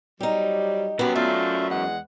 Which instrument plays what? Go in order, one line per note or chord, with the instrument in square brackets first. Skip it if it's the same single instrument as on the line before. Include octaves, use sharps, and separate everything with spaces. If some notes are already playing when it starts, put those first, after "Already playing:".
[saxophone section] F#3 G3 [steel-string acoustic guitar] D#4 G4
[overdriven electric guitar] F#2 F#3 [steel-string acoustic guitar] G3 B3
[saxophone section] A3 F4 E5 [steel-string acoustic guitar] D5
[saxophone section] E2 G#3 F#5